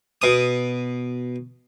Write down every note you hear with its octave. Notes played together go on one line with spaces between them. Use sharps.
B2 D#6